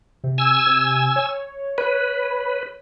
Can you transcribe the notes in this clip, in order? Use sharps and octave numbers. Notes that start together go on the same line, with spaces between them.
C3
G#5 E6
C3
C#5
B4 C#5